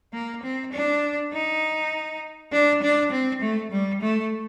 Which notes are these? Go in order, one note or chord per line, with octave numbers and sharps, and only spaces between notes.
A#3
C4
D4
D#4
D4
D4
C4
A3
G3
A3